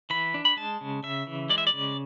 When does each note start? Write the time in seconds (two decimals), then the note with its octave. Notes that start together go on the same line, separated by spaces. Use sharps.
0.10 E3 B5
0.34 D4
0.45 B5
0.57 G#3 A5
0.81 C#3
1.03 C#3 E5
1.27 E3
1.49 G#3 D5
1.58 E5
1.67 D5
1.73 C#3